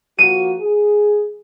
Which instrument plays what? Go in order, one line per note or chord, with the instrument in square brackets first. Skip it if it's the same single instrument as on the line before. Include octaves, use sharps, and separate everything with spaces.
[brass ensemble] F3 A#3 F#4 [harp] D#7
[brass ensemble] G#4